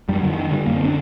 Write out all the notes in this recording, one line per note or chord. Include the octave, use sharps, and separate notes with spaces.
F#2 G3
F#3
D3 D#3
D3 D#3
D3 G3
F#2 A#3
C4
D3 D4